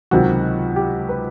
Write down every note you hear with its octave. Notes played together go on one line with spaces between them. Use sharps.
C#2 C3 D#3 F#3 F#4
G4
B4